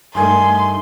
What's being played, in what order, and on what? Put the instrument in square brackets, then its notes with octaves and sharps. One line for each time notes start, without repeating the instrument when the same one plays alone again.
[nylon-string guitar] G2 D#3 A3 [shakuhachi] G#5 [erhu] C6